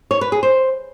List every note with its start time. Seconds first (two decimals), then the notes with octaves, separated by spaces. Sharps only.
0.11 C#5
0.21 B4
0.32 G#4
0.43 C5